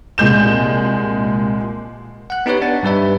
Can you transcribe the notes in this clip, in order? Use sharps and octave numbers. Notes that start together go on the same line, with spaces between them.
C2 A#2 G#3 G6 E7
F#5 F#6
B3 D#4 G4 B4 C#5
D4 F#5 A6
G2 G3 B4 E5